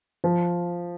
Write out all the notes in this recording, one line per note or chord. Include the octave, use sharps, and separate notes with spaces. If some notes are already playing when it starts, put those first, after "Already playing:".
F3